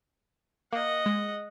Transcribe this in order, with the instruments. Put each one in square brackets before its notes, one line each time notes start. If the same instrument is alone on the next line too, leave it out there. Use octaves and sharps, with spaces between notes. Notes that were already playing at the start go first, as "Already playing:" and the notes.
[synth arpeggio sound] A#3 [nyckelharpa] D#5 F#5
[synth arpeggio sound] G#3